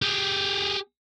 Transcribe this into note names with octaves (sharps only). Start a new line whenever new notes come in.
G4 G#4